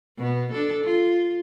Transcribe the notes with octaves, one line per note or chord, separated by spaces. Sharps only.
B2 B3
D4 A4
F4